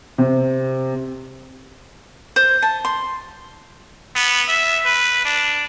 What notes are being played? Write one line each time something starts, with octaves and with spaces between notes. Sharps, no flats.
C3
C5
A5
C6
B3
E5
B4
D4